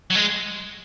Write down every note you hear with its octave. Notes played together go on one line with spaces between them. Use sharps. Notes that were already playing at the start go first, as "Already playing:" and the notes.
F#3
G#3